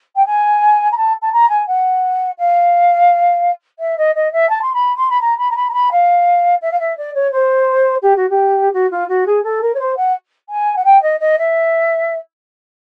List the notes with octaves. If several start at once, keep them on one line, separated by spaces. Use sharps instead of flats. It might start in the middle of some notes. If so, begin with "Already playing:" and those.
G5
G#5
A#5
A5
A5
A#5
G#5
F#5
F5
E5
D#5
D#5
E5
A5
C6
B5
C6
B5
A#5
B5
A#5
B5
A#5
B5
F5
E5
F5
E5
D5
C#5
C5
G4
F#4
G4
F#4
F4
F#4
G#4
A4
A#4
C#5
C5
F#5
G#5
F#5
G5
D#5
D#5
E5